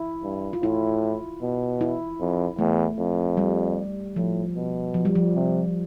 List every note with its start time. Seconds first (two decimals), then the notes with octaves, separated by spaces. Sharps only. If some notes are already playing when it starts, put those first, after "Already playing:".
Already playing: E4
0.23 G2
0.53 F4
0.62 A2 E4
1.42 B2
1.81 E4
2.20 F2
2.59 E2 A3
2.98 F2
3.37 G3
4.16 A2 F3
4.55 B2
4.94 F3
5.05 G3
5.15 F3
5.35 C3